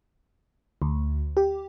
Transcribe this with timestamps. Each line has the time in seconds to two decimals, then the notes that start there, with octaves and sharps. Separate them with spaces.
0.82 D2
1.37 G4